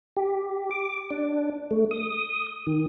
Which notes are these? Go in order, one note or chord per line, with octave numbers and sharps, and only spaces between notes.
G4
D6
D4
A3
D#6
D#3